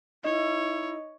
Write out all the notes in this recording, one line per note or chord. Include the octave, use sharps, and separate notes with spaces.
D#4 E4 C#5 D#5